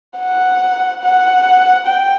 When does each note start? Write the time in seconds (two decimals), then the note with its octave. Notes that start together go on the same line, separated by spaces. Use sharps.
0.19 F#5
1.02 F#5
1.87 G5